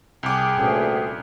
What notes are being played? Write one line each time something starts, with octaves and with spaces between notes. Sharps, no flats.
C2 G#4 G5 D6
D2 G2 A#2 A3 C#4 D4